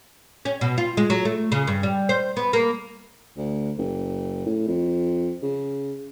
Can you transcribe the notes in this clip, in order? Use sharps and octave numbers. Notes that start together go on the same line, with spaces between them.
C#4
B2
F4
G#3
F#3
A3
C#3
G2
G3
C5
B3
A#3
D2
F#1
A2
F2
C#3